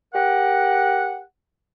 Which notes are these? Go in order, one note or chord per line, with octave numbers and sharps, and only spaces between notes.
G4 A#4 F#5